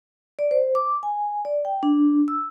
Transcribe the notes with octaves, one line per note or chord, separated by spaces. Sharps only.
D5
C5
D6
G#5
D5
G5
D4
E6